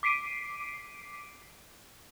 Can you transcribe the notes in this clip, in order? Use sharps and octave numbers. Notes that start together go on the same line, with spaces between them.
D6 B6 C7 D7 D#7